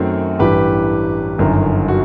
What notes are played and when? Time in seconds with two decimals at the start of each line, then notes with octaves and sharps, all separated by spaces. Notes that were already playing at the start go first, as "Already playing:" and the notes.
Already playing: F#2 D#3 A3 C4 F#4
0.39 A1 G2 E3 G4 B4
1.38 G1 F#2 D#3
1.88 F#4